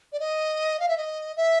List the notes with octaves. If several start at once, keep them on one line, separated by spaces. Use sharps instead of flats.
D5
D#5
F5
E5
D#5
E5